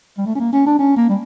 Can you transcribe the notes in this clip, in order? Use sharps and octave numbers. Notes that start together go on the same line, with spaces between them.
G3
A3
C#4
A#3
C#4
D4
C#4
A#3
G3